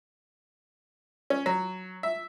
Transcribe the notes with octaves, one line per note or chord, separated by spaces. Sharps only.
C#4
F#3
E5